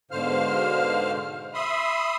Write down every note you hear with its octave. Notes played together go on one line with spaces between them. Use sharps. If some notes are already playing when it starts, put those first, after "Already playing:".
G#2 B2 D3 C5 F5 F6
E5 B5 C6 D#6